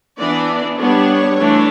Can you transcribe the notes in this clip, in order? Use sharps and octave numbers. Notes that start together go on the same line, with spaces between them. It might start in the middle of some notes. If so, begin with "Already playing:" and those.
E3 B3 D4 D5
G3 B3 D4 C#5
E3 A3 D4